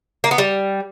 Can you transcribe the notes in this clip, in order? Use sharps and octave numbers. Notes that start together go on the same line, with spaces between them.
A#3
B3
G3